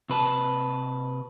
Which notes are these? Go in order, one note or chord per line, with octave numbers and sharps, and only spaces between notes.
C3 B4 A5